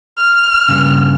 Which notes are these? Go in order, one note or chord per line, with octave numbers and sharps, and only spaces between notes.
F6
G2 C#3